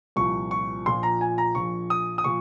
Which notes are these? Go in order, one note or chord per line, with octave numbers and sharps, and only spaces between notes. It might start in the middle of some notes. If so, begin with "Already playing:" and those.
C2 A#2 F3 C#6
C#6
A#1 A#2 F3 C6
A#5
G#5
A#5
A#1 A#2 F3 C#6
D#6
D#6
A#2 F3 C#6